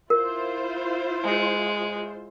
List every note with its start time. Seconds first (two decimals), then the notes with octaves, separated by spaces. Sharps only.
0.10 E4 F4 A#4 C5
1.24 G#3